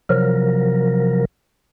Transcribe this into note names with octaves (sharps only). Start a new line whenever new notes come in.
C3 F3 F#3 A#4